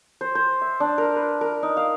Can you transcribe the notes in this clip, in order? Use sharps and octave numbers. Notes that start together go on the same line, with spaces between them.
C5
C5
E5
D4
A#4
B4
A#4
D#4
F5